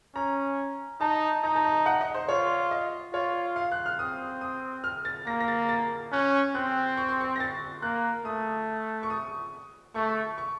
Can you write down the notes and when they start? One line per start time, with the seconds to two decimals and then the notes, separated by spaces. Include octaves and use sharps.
0.15 C#4 A#5
1.00 D#4 A5
1.43 D#4 A#5
1.55 A5
1.64 A#5
1.86 F#5
2.01 D#5
2.14 C5
2.29 F4 C#5
2.71 D#5
3.13 F4 C#5
3.56 F5
3.72 F#6
3.86 F6
3.99 C4 D#6
4.41 D#6
4.84 F6
5.05 A6
5.27 A#3 A#6
5.40 A#6
5.48 A6
5.69 A6
6.12 C#4 F#6
6.55 C4 F#6
6.97 C#6
7.09 C6
7.21 C#6
7.36 A#6
7.40 A6
7.82 A#3 F#6
8.25 A3 D#6
9.03 C#6
9.10 D#6
9.95 A3 C#6
10.38 C#6